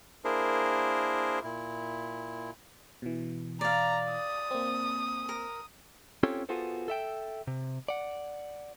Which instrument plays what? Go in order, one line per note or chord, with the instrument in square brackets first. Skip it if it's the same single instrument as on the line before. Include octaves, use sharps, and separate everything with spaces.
[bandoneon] A#3 D4 E4 G#4 A#4 C5
A#2 E4
[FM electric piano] B2 E3
[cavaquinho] D5 F5 [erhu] A#5
[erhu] D#6
[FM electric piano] A#3 C4
[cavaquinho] A#4
[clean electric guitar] C4 C#4 F4 G4 A4 C#5
B3 F4 F#4 G#4 A4 C5
A4 E5 G5
C3
D5 F#5